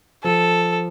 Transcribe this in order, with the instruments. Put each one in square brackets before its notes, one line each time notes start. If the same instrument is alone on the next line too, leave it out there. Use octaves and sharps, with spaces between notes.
[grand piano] F3 [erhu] A4